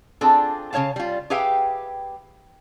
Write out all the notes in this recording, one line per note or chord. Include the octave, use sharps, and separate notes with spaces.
C4 D4 F4 G#4 A4
C#3 C4 C#5 F5 A5
G3 F4
G4 G#4 B4 E5 F5 G5